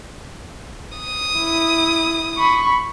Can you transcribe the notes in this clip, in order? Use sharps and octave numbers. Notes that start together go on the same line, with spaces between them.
D#6
E4
B5 C#6